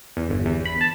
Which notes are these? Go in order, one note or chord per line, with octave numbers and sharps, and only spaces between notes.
E2
G1
E2
B5
A5